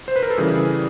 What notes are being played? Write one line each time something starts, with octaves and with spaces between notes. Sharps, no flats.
C5
B4
A#4
A4
C#3 E3 G3 G#4